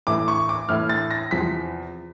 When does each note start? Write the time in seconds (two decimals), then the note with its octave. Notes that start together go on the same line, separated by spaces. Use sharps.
0.07 A2 E3 A3 D6
0.28 C#6
0.49 D6
0.69 A2 E3 A3 F6
0.89 A6
1.11 A#6
1.31 E2 C3 F3 B6